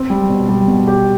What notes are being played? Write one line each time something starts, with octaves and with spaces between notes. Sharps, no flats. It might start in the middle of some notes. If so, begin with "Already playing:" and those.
Already playing: C4
G3
B2
G3
B2
G4